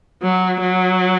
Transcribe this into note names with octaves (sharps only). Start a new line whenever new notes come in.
F#3
F#3